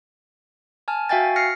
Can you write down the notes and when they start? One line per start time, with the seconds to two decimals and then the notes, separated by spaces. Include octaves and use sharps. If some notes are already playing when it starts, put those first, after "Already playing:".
0.88 G#5 A5 F6
1.09 F#4 E5 F5 G5 G#5 A6
1.36 F6 A#6 C7 C#7